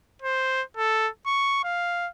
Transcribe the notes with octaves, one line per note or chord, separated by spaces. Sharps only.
C5
A4
C#6
F5